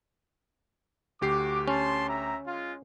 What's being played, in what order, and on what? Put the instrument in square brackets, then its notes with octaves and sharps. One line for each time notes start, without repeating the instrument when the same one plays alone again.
[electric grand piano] D2 G4 C7 [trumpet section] F#4 D6
[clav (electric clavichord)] C#4 [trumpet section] A5 C6
[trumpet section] E5 A#5
G#3 F4